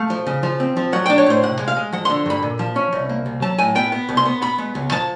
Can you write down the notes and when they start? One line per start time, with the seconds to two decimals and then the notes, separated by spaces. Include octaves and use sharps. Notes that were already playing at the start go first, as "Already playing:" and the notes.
Already playing: A3 F5
0.10 F3
0.27 C#3
0.43 F3
0.60 C4
0.77 F3
0.93 F#3 F#5
1.06 D4 G5
1.18 C#5
1.26 A2 C5
1.43 C3 F#5
1.59 G#3
1.68 F5
1.76 G#3
1.93 F3 F#5
2.05 D3 C6
2.26 G2 B5
2.43 A#2
2.59 F3
2.76 C#4
2.93 C2
3.09 A#3
3.26 C2
3.42 F#3 A5
3.59 A2 G#5
3.75 B3 G5
3.92 B3
4.09 C2
4.17 C6
4.25 B3
4.42 B3 B5
4.58 G#3
4.75 C#2
4.92 F3 A5